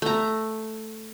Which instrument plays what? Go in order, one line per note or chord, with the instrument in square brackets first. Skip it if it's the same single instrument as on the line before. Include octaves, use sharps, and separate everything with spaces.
[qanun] A3 A#5